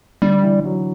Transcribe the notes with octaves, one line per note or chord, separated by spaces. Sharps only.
D3 G3
E3
F#3